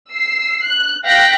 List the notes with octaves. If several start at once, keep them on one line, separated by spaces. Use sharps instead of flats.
E6 C7
F#6
F5 G5 F#6 A#6 B6